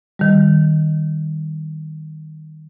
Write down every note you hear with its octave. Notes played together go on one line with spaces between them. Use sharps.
D#3 G3